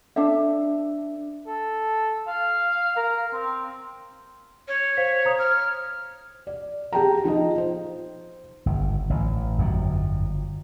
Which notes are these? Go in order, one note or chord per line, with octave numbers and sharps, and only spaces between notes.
D4 A4 E5
A4
F5
A#4
C4
C#5
C5 F5 B6
C5 A#5 D#6
F6
D5
G4 G#4 G5 A5 A#5
F3 D#4 F4 D#5
C5
G1
A1
G1 F2 D3 F#3